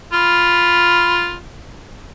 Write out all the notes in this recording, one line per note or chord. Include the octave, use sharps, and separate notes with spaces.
F4 B5